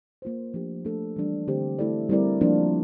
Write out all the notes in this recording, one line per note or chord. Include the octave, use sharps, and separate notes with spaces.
A#3 F4 C5
F3 A3 D4 G4
A3 D4 A4
E3 G3 D4
D3 A3 C4 G4 C5
A3 E4 A4 D5
G3 C4 E4 A#4 D5
F3 A#3 D4 F4